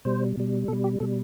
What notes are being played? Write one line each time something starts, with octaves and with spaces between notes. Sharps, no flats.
B2 G3 C5
B2 G3
B2 G3 A4
G4
B2 G3 A4